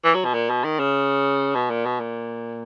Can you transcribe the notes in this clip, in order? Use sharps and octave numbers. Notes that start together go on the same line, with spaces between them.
E3
F#3
B2
A#2
B2
D#3
C#3
B2
A#2
B2
A#2